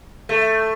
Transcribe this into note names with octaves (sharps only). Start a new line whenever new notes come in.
A3